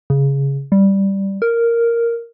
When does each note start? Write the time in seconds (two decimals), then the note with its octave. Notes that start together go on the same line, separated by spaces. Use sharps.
0.10 C#3
0.72 G3
1.42 A#4